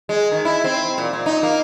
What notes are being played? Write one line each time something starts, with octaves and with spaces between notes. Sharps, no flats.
G#3
D#3
E4
C4
A#2
A#2
D#4
A#3